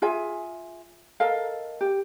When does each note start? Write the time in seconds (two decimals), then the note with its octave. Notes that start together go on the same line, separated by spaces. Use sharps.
0.02 F4 G#4 E5 G#5
1.20 A4 A#4 D#5 F5
1.81 G4